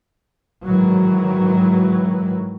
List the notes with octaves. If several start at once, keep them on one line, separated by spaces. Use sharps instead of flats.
G#2 D#3 E3 F#3